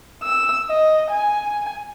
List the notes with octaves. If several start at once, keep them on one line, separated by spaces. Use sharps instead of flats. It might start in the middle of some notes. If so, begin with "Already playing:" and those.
E6
D#5
G#5